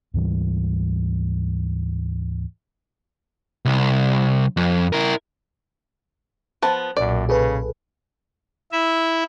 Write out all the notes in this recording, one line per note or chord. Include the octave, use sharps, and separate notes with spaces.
D2 G#2 E3 G3
C2
F2
E4 A#4
F3 B3 A5
B1 F#2 A#2 D5
C#3 G#4 A4 B4
E4 E5